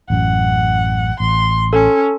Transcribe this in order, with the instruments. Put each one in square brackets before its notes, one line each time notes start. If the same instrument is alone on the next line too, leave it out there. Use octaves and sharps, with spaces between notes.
[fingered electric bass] A1 F#2 [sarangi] F#5
[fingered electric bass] A1 [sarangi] C6
[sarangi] C#4 [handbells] A4